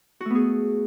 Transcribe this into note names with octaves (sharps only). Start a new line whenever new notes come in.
A3 B3 F#4 G#4